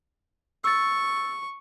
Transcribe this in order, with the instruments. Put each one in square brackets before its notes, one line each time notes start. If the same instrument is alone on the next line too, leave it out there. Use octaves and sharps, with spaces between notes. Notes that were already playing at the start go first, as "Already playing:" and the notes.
[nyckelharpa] C#6 [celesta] E6 A6